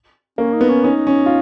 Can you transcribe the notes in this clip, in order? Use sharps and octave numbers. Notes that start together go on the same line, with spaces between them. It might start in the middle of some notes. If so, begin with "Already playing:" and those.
A#3 C#4
D#4
B3
C#4
C#4 D#4
C#4
F4